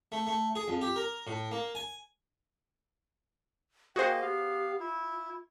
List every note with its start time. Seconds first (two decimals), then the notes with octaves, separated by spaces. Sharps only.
0.12 A3
0.27 A3
0.55 G#4
0.68 F2
0.81 G4
0.96 A#4
1.27 A2
1.51 A#3
1.75 G#5
3.96 A#3 F#4 G#4 C5 D#5 G5
4.22 B3 G4 F5
4.80 E4 F4